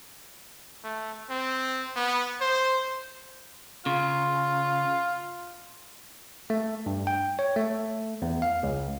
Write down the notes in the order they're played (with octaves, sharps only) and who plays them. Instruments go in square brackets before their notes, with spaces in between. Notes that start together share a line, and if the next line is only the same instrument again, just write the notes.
[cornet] A3
C4
B3
C5
[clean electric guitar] C#3 [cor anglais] F4
[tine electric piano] A3
G2
G5
C#5
A3
E2
F5
C#2